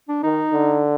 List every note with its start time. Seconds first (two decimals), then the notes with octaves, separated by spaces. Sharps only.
0.09 D4
0.23 D#3 D#4
0.52 D3